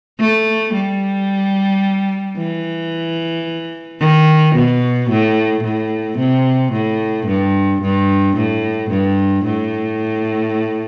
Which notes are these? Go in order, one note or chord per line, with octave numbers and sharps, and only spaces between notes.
A3
G3
E3
D#3
B2
A2
A2
C3
A2
G2
G2
A2
G2
A2